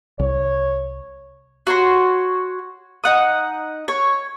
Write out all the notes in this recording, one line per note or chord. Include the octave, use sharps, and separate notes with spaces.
C2 C#5
F#4 C#5 C6
D#4 F#5 D#6
C#5